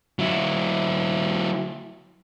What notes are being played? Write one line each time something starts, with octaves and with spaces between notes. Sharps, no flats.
F#3 E4